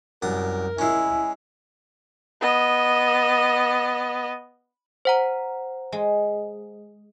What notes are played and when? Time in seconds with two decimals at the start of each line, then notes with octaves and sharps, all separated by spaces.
0.22 C2 F#2 A#4 D#6
0.79 G#3 C#4 E4 G#5
2.41 B3 D#5
5.05 C5 F#5 A#5
5.92 G#3